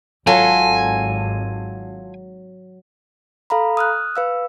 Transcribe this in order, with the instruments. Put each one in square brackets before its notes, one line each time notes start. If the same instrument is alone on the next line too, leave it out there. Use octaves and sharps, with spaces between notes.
[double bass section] G#1 [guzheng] F#3 [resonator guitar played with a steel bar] F4 A4 [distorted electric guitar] G#5
[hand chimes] A4 F5 A#5 B5
D#6 F6 F#6
B4 F5 E6